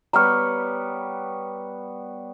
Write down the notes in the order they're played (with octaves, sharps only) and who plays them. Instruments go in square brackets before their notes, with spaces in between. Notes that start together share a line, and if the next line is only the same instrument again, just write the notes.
[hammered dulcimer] G3 B3 C#5 [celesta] A#5 F6